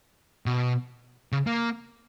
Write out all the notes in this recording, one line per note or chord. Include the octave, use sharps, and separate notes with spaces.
B2
C#3
A#3